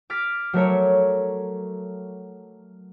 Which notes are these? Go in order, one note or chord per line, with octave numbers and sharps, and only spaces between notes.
D6 F6 A6 B6
F#3 A3 A#4 C#5